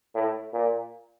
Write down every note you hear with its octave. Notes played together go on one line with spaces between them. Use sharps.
A2
A#2